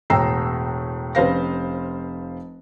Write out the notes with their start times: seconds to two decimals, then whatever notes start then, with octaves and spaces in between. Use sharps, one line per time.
0.10 E1 A2 G5 A#5 E6 C7
1.15 F1 C#4 B4 C5 F5 A#6